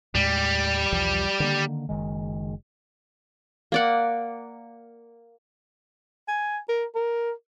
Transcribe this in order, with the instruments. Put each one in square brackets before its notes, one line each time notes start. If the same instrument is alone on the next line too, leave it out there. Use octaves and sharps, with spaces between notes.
[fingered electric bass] D#2 A2 G#3 [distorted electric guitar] G3
[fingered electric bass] B1 E2 F3
D3 D#3 A#3
F#1 D#3 G#3
[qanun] A#3 D5 F#5
[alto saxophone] G#5
A#4
A#4